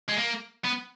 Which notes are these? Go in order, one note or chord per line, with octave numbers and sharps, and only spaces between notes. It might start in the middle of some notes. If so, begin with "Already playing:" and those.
G#3
A#3
B3